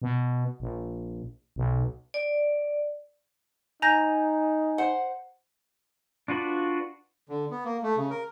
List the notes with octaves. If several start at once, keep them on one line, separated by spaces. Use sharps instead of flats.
B2
A#1
B1
D5
D#4 G#5 A#5 G6 A#6
C5 F#5
D4 F4 F#4 B4 D5
D3
B3
A#3
A3
C#3
A#4